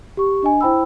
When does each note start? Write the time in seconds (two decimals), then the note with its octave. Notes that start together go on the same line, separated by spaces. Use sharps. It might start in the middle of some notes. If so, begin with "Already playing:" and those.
0.17 G4 C#6
0.43 D4 D#5 G#5
0.61 E4 C5 G5 B5 E6